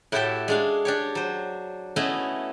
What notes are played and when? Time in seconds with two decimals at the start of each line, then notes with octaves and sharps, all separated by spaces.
0.12 A2 E4 F#4 G4 A4 G5
0.48 G#3 D4 F5
0.85 D4 G4 C#5
1.15 F#3 C5
1.96 A3 B3 C#4 E4 F#4 D#5